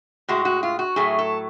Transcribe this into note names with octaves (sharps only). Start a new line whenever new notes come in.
A2 G#3 F#4
F#4
F4
F#4
A2 F#3 A3 G#4
A4